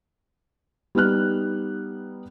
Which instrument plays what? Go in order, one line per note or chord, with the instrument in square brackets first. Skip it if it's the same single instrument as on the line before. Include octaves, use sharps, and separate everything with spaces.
[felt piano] G3 B3 D#4 F6 F#6